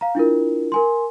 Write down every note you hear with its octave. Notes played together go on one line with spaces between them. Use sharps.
F5 A#5
D4 E4 F4 A#4
A#4 G#5 C6